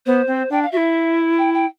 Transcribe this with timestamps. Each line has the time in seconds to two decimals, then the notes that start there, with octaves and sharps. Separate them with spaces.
0.06 B3 C5
0.27 C4
0.50 D4 G5
0.62 F5
0.72 F#4 E5
0.77 E4
1.38 G5
1.54 G5